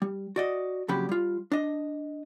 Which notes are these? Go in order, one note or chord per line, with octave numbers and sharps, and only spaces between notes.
G3
F#4 D5 D#5
F2 A#2 C#3 F#3 G4 B5
G3 F4
D4 D#5